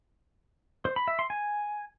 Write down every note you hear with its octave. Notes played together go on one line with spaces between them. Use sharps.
C5
B5
E5
C6
G#5